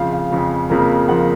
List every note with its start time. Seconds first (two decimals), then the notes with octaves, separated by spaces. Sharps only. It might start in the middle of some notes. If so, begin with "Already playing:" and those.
Already playing: F2 C#3 F3 F5
0.13 F5
0.31 F2 C#3 F3
0.70 F2 C#3 F3 A#3
1.08 C#3 F3 A#3 F#5